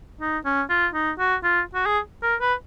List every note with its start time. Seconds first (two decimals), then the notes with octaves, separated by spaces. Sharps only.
0.21 D#4
0.45 C#4
0.70 F4
0.94 D#4
1.19 F#4
1.44 F4
1.75 F#4
1.86 G#4
2.23 A#4
2.41 B4